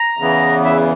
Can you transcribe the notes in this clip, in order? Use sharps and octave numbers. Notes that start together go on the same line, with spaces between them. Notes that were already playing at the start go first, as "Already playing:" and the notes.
Already playing: A#5
E2 C#3 E3 B3
E5